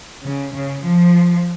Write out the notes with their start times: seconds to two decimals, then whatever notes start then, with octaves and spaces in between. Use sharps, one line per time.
0.25 C#3
0.54 C#3
0.83 F3